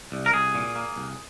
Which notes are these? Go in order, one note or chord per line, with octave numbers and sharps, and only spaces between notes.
C2
A#4
C2 G#4
A#2
A#3
C2